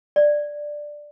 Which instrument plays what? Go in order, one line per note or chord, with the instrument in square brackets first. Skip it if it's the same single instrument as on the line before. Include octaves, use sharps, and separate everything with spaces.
[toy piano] D5